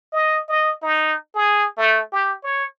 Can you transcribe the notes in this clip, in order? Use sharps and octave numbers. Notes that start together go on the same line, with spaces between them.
D#5
D#5
D#4
G#4
A3
G4
C#5